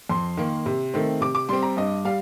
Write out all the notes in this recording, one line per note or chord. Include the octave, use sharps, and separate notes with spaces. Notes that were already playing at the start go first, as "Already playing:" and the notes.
F2 C6
D#3 A#3
C3
D#3 A3 C4
C3 D6
D6
G3 C4 C6
A#5
G2 D#5
G3 F5